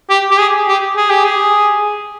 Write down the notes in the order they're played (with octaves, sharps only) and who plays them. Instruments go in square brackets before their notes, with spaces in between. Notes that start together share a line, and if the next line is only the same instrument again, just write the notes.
[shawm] G4
G4
G#4
G4
G#4
G4
G#4